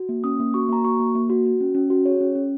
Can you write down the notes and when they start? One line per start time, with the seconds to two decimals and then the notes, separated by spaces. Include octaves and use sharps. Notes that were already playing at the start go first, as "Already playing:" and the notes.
Already playing: F#4
0.09 A#3
0.24 C#4 D#6
0.40 A#3
0.54 F#4 C#6
0.69 A#3 A#5
0.84 F#4 C#6
1.00 A#3
1.15 A#3
1.30 F#4
1.45 F#4
1.60 C#4
1.75 C#4
1.90 F#4
2.05 G#4 C#5
2.20 C#4
2.35 C#4